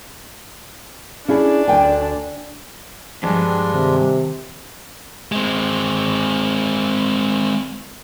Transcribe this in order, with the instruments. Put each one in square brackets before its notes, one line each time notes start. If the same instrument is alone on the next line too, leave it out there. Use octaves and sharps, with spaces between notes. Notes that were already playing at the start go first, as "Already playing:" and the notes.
[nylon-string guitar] C#4 E4 G#4 [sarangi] D4
[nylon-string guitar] D2 G5 G#5
[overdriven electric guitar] E2 G2 [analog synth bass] F3 [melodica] G#3 D4
[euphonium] C3 [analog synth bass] D#3
[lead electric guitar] G#3 C4